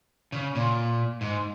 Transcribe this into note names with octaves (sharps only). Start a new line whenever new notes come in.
C#3
A#2
G#2